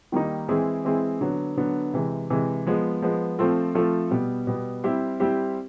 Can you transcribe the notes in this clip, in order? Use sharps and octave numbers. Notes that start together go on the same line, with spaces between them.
D#3 G3 A#3 D#4
E3 G#3 C4 E4 G#4
E3 G#3 C4 E4 G#4
D3 F#3 B3
D3 F#3 B3
C3 E3 G#3
C3 E3 G#3
F3 G#3 B3
F3 G#3 B3
F3 A3 C4 F4 A4
F3 A3 C4 F4 A4
B2 G3 B3
B2 G3 B3
G3 C4 E4 G4 C5
G3 C4 E4 G4 C5